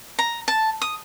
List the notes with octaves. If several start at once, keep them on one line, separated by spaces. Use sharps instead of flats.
A#5
A5
D#6